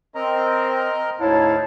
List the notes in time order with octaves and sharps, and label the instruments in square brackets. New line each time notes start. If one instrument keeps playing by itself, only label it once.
[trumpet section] C4 [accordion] A#4 D#5 A#5
[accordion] D2 G#2 D#4 [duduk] E4 [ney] C#5 [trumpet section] F5 A5